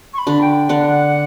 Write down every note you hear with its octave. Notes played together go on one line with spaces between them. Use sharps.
C#6
B5
D3 D4
G5
D3 D4 F#5